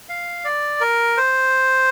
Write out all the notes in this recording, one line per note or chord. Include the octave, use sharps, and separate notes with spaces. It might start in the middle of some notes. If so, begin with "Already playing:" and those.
F5
D5
A#4
C5